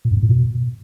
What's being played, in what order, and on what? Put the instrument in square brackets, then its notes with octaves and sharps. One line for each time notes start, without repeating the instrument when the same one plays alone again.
[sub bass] A#2
F#2
G2
A#2
B2